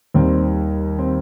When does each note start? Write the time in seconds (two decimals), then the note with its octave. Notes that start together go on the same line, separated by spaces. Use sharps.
0.14 D#2 D#3 G3 C4
0.99 C4